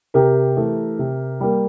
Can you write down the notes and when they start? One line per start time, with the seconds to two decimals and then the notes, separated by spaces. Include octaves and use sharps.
0.14 C3 G4 A#4
0.57 E3 A3
0.99 C3
1.41 G3 A#3